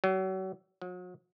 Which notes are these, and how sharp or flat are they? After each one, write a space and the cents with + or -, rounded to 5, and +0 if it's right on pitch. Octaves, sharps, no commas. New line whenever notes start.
F#3 +35
F#3 -40